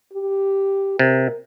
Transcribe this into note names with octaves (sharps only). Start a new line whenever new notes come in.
G4
C3 A#4